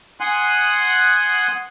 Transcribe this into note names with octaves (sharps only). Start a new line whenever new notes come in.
F#5 G#5 C6 D#6 F#6